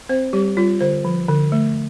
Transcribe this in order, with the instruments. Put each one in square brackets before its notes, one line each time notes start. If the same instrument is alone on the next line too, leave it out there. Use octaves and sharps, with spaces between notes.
[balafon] C4 C5
G3 G4
G3 F4
D3 C5
F3
D3
A3